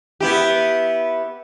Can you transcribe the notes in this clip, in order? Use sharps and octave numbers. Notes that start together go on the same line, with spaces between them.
B3 E4 G4